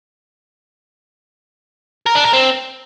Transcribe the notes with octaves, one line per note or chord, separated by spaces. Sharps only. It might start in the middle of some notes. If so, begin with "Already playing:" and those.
A#4
D4
A#4
C4